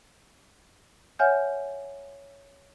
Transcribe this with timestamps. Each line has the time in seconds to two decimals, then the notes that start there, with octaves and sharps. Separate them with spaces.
1.19 C#5 E5 F#5 G#5 F6 G6